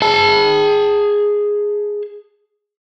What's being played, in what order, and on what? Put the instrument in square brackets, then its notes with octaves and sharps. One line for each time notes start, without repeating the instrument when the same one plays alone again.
[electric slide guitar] G#4 A5